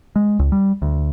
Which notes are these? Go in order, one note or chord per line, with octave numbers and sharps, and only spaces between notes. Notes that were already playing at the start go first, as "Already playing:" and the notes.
G#3
C#2
G3
D2